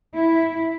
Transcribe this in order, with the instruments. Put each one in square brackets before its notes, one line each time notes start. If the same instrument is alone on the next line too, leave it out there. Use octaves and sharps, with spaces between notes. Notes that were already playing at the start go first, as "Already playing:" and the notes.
[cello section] E4